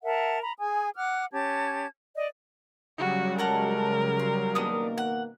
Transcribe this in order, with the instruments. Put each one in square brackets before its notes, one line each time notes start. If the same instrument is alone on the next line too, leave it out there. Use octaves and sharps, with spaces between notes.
[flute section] A#4 E5 F#5 A5
A#5 B5
G#4 G#5 D#6
F#5 D6 F6 F#6
C#4 G4 A5 G#6
D5 D#5
[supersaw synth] C#3 F#3 G3 [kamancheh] F#4
[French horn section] G#3 [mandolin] A4 F#5 A#5 [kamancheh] A#4
[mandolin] C6
[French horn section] B2 D#3 A#3 [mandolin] B3 D4 D#6
[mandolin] F#5